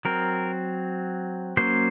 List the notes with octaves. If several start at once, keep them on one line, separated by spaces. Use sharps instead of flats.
F#3 C4 A#4
F#3 A#3 C#4 C5